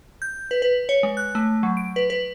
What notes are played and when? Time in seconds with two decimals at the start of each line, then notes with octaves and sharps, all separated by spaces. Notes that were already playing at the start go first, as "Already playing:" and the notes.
0.22 G6
0.51 B4
0.62 B4
0.89 C#5
1.03 G#3
1.17 F#6
1.35 A3
1.63 F#3
1.77 D7
1.96 B4
2.10 B4